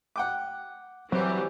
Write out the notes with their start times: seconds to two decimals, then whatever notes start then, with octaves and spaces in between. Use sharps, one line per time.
0.16 F#5 G5 D6
1.12 E3 F#3 G3 C4 G4